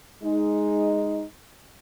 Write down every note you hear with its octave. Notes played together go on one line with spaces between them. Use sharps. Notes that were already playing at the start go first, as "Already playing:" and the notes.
G#3 D#4